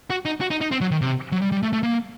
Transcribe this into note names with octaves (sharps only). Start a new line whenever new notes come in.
F#4
D#4
F#4
D#4
D#4
C4
F#3
D#3
C3
F#3
G3
G3
A3
A3
A#3